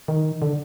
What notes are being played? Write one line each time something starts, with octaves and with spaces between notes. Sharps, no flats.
D#3
D3